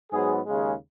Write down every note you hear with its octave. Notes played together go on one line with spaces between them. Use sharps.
G#2 F#3 B3 G#4
D#2 C#3 G#3